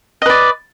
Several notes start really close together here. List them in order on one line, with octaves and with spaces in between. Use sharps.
D#5 B4 D5